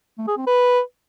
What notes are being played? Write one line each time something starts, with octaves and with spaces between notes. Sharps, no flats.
A3
G#4
C4
B4